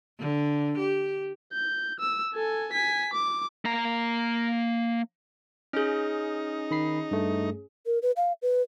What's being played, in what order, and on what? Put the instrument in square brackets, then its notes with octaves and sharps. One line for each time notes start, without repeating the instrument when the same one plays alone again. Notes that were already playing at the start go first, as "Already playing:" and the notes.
[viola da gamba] D3
G4
[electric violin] G6
E6
A4 G#5
G#5 B6
D6
[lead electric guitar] A#3 A#5
[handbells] C#4 G#4 [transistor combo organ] D#4 [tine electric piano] F6 G6
[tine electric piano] D#3 B5 C7
G2 A3
[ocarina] A#4
B4
F5
B4